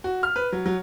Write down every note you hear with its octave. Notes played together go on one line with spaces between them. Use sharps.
F#4
F6
B4
F#3
F#3